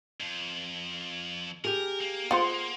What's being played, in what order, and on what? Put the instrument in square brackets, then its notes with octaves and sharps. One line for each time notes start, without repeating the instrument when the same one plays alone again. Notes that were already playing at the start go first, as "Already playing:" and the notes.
[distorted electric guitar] F2
[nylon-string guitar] G4 G#4 [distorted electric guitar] A#4
[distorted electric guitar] A#3
[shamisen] F4 C5 [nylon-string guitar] G#4 F#5 [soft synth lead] C6